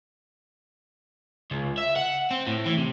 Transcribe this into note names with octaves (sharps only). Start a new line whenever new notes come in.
C#2
E5
F#5
C4
A2
E3
C3